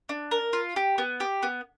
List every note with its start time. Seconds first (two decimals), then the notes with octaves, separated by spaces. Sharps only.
0.09 D4
0.31 A#4
0.53 F4
0.76 G4
0.98 B3
1.20 G4
1.43 B3